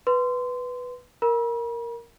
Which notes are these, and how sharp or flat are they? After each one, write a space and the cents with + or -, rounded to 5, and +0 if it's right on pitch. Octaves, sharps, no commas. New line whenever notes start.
B4 +0 C6 -20
A#4 +0 B5 -45